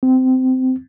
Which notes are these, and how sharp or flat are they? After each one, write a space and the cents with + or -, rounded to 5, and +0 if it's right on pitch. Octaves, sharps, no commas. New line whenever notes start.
C4 -20